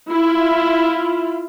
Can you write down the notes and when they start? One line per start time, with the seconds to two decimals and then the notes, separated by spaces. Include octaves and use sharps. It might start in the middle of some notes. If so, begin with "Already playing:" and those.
0.11 E4 F4